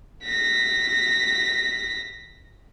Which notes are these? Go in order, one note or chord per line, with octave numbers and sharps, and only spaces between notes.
A#6 B6